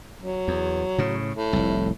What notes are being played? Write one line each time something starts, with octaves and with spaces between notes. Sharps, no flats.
F#3
E2
A2 C#3
A2
F1 C2